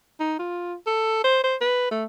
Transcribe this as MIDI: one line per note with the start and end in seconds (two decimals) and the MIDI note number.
0.20 0.34 63
0.39 0.74 65
0.87 1.22 69
1.24 1.41 72
1.44 1.56 72
1.61 1.90 71
1.91 2.05 57